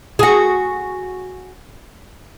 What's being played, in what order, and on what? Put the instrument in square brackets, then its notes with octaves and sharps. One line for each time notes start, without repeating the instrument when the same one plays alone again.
[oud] F#4 G#4